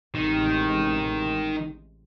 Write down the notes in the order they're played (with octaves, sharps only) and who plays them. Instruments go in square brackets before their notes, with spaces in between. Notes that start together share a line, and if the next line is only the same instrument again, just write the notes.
[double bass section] A1 C3 G#3 [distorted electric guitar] D#3